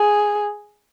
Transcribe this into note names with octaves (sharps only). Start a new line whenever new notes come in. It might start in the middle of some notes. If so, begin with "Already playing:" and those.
Already playing: G#4